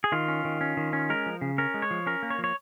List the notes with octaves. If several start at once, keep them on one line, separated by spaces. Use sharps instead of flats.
G#4
D#3 F4
C#4
D#3
C#4
D#3
C#4
G#3 A#4
F3
C#3
C#4 A#4
G#3
C#5
F3
C#4 A#4
A#3
C#5
F3
C#5